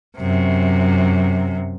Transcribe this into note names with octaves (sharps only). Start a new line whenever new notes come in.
F#2 C3